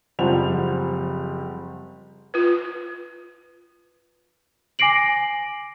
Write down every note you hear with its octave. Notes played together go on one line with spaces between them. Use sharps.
F#1 F3 G3 C4 F#5 F7
F4 B4
G#5 D6 A#6 C7 D7 F#7